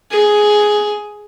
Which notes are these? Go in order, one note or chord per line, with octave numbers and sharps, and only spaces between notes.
G#4